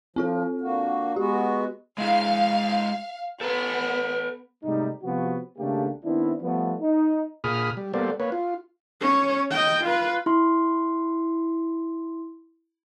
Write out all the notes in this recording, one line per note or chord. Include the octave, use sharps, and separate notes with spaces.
F3 C4 F4 A4
D3 A#3 F#4
G#3 B3 F#4 G4
G#3 E4 G#4 F5
B3 A4 B4
G#2 C3 G3 A3 D#4
C3 F3 B3 F#4
G#1 C#3 A3 A#3 D4 G4
D#3 B3 C4 D4 E4
F3 G3 A3 B3
D#4
A#2 G#4 B5 D#6 F6
G3
G3 A#3 B3 A4 C5 D5
A#3 B4 C#5
F4
C#4 C#5
D#5 G5
F4 B4
E4 C6